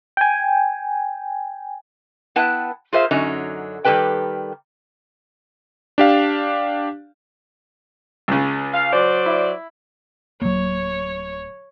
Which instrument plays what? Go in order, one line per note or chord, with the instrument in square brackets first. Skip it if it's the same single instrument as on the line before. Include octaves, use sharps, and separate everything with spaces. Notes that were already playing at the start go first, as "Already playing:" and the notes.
[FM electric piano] G5 G#5
[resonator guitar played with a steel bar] B3 E4 B4 F#5 G5 A5
F4 G#4 A#4 C5 E5 F5
F#2 D3 F#3 C#4 D#4 A#5
D#3 G3 G4 A4 B4 G5
[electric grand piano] D4 G4 F5
[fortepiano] C#2 C#3
[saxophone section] F5
F#3 C5 D5
[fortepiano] E4
[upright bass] D1 C4 [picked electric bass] F#3 A#3 [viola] C#5